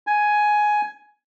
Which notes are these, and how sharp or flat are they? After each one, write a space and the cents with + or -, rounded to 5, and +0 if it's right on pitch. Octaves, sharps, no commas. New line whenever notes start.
G#5 +10